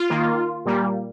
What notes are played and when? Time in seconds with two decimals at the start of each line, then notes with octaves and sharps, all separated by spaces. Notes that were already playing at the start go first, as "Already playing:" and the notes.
Already playing: F4
0.10 D#3 A#3
0.65 A#2 G3 A#3